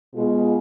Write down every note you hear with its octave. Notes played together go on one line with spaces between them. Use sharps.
B2 G#3 B3 F4 G#4